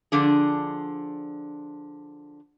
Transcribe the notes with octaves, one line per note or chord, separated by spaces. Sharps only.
D3 F3 D4 G#4